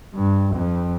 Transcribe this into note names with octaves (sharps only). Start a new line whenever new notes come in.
G2
F2